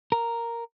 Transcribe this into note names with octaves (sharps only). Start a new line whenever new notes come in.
A#4